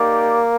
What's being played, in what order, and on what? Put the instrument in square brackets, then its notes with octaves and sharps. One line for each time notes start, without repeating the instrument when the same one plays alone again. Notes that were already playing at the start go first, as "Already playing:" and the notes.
Already playing: [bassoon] A#3 [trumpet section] D#4 G4 D5 G5